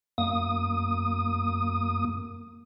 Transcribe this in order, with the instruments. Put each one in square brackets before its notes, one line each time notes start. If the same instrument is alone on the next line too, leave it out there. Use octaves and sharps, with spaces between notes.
[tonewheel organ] F#2 A#3 D#6